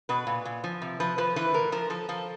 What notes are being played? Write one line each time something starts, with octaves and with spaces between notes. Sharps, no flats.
B2 B4
A#2
A#2
F3
C3
F3 B4
F3 B4
E3 B4
A2 A#4
F3 A#4
F3 A4
F3 A4